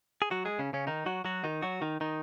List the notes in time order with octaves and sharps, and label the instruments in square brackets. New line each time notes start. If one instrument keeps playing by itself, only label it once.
[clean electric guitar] G#4
F#3 F#4
G#3 G#4
C#3 C#4
C#3 C#4
D#3 D#4
F#3 F#4
F#3 F#4
D#3 D#4
F#3 F#4
D#3 D#4
D#3 D#4